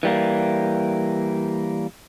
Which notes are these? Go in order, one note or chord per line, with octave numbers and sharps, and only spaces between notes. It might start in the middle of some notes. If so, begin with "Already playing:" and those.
E3 G3 A#3